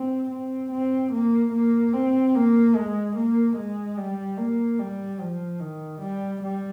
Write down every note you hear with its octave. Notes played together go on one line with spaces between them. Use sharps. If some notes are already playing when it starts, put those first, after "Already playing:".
Already playing: C4
C4
C4
A#3
A#3
C4
A#3
G#3
A#3
G#3
G3
A#3
G3
F3
D#3
G3
G3